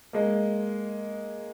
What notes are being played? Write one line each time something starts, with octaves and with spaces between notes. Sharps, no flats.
G#3 A#3